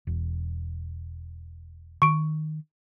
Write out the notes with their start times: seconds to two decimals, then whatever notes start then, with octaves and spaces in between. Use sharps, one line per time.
0.07 E1
2.02 D#3 C#6 D7